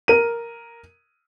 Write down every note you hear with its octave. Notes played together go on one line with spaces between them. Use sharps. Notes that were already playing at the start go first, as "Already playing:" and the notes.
A#4 D#7